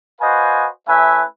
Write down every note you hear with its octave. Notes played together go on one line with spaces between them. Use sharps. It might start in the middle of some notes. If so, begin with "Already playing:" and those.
F#4 B4 C5 D#5 F5 G#5
A3 C#4 E4 B4 E5 G#5